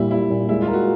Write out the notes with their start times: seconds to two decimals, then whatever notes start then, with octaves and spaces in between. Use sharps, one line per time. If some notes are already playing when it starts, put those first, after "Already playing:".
Already playing: A#2 G3 E4
0.11 G3 E4
0.30 A#2
0.48 G#3 E4
0.62 F4
0.68 A#4
0.73 F#4